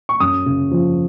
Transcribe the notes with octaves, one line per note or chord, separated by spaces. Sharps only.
C#6
F#2 D#6
C#3
F3